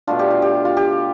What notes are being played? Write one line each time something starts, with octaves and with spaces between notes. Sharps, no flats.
B2 A3 D4 F4
G4
F4
G4
F4
G4